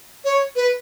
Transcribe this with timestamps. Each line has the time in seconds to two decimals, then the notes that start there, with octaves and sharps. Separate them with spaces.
0.25 C#5
0.56 B4